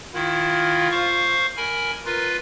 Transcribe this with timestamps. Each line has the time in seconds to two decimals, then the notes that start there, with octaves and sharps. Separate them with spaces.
0.14 D#3 E4 F4
0.91 C5 F5 C#6
1.57 A#4 G#5 B5
2.06 F4 A#4 B4